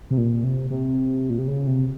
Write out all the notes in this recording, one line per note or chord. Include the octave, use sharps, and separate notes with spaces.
C3
A#2
C3
C3
A#2
C3
C#3
C3